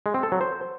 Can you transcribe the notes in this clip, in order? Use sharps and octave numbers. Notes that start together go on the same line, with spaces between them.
G#3
C4
A4
F#3
C5